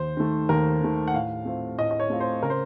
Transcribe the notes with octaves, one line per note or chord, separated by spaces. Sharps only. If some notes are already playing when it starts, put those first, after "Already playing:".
Already playing: D#2 C5
D#3 A3
D#2 A#4
D#3 A3
F#5
A2 F5
A3 C4 F4
A2 D#5
D#5
C#5
A3 C4 F4
C5
C#3 A#4
C5